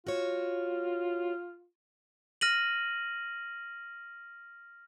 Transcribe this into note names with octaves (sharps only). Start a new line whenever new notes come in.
F4 F#4 C#5
F6 A#6 D#7 F#7